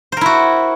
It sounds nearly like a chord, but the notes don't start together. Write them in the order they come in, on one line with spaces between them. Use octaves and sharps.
C5 A#4 E4 F#4